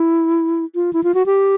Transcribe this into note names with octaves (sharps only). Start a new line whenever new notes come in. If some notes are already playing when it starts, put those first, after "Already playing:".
Already playing: E4
F4
E4
F4
F#4
G4